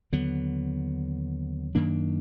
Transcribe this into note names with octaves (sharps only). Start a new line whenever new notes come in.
D#2 D3 F#3 B3
F#2 D#3 A#3 D4